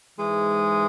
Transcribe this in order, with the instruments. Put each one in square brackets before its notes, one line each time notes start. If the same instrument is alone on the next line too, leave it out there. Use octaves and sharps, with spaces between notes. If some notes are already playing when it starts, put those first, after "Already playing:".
[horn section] G#2 E3 G#3